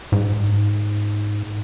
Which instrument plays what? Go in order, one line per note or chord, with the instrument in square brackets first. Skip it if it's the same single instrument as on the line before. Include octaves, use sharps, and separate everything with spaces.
[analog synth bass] G#2